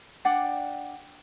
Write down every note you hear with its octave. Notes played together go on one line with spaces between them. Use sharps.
D4 D5 F#5 G5